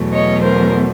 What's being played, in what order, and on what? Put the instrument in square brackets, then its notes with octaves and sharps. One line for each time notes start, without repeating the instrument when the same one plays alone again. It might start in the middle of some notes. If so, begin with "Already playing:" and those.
Already playing: [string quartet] E2 B2 F#3 A3
C#5 D#5
A#4 C5